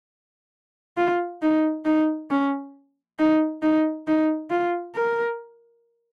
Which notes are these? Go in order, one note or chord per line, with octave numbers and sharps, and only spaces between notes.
F4
D#4
D#4
C#4
D#4
D#4
D#4
F4
A#4